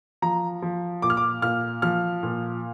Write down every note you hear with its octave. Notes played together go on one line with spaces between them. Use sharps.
F3 A#5
F3
A#2 D6
F6
D6
A#2 F6
F3 F6
A#2